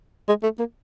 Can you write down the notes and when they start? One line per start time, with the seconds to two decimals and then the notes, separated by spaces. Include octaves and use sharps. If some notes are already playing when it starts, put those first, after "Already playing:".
0.28 G#3
0.43 A3
0.59 A#3